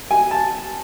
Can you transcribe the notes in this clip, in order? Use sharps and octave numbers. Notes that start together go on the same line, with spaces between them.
G#5
A5